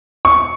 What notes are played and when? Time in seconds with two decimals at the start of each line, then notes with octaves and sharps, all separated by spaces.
0.25 C#6